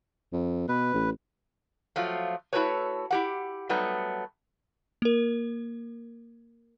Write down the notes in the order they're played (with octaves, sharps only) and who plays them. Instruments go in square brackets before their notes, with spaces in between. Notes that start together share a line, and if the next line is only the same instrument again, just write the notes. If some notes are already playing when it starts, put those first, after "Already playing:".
[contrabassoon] F2
[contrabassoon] B2 [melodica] B4
[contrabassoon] A1
[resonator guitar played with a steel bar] F3 F#3 A3 F4
A3 E4 F#4 A4 B4 C#5
E4 G4 F#5
F#3 G3 A3 B3 D#4
[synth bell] A#3 A#4